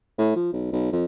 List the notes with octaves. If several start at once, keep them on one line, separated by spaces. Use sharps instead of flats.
A2
F3
B1
B1
F2